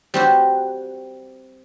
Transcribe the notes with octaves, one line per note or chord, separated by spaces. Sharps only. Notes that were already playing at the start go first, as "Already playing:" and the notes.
G3 C4 F#4